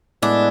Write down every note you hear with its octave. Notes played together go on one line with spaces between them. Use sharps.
A2 G#3 B3 D4 E4